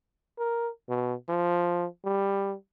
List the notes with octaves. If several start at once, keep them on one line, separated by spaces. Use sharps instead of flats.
A#4
B2
F3
G3